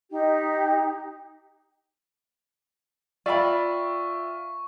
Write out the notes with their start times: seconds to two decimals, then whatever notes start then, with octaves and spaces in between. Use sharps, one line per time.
0.10 D#4 G4
3.26 F4 D5 E5 G5 B5 C#6